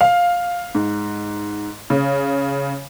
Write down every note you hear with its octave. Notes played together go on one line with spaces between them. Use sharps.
F5
G#2
C#3